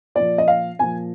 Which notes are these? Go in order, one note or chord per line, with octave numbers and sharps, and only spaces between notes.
A#2 F3 D5
D#5
F5
A#2 F3 G#5